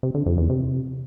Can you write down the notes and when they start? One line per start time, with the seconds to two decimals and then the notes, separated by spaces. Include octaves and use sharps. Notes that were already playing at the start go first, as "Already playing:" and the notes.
0.03 C3
0.15 D3
0.26 F2
0.38 E2
0.49 C3